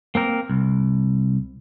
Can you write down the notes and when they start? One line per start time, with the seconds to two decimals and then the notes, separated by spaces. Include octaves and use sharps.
0.15 A#3 C4 A#4
0.50 C2